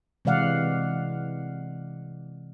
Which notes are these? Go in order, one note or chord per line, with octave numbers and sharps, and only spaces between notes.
C3 E3 G#3 D5 F5 F#5